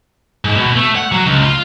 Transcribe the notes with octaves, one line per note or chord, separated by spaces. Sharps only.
G#2
B2
A3
F#5
F#3
C#2
F4